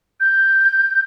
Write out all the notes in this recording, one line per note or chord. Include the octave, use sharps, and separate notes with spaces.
G6